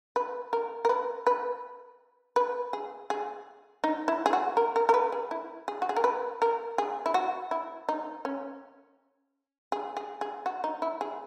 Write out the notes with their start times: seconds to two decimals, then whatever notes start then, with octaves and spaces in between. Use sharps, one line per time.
0.16 B4
0.53 A#4
0.85 A#4
0.89 B4
1.27 B4
2.36 B4
2.73 G#4
3.10 G#4
3.84 D#4
4.08 E4
4.26 G#4
4.33 F#4
4.57 A#4
4.76 A#4
4.89 A#4
4.94 B4
5.12 G#4
5.31 E4
5.68 G#4
5.82 F#4
5.89 G#4
5.96 A#4
6.04 B4
6.42 A#4
6.78 G#4
7.06 E4
7.14 F#4
7.51 E4
7.89 D#4
8.25 C#4
9.72 G#4
9.97 G#4
10.21 G#4
10.46 F#4
10.64 D#4
10.82 E4
11.01 G#4